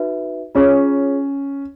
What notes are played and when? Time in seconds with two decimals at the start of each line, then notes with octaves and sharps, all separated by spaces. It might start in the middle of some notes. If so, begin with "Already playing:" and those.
Already playing: D#4 F#4 B4 E5
0.55 C#4 F4 G#4 C#5